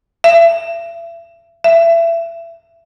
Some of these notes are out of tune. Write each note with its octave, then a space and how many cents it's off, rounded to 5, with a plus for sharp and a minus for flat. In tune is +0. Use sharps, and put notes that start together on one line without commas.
E5 +35
E5 +25